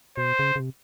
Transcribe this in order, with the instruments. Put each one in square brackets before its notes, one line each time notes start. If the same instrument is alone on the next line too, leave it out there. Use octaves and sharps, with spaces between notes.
[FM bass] B2 [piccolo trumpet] C5
[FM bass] C#3
C#3
C3